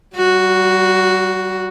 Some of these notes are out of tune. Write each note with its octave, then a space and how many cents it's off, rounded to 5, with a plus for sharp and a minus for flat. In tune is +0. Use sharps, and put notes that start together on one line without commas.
G3 -40 F#4 +0